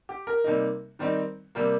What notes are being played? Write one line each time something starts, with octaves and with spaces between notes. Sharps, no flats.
G4
A#4
C3 G3 A#3 D#4
D#3 G3 C4 D#4
C3 G3 A#3